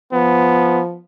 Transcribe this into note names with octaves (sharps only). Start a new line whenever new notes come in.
F3 B3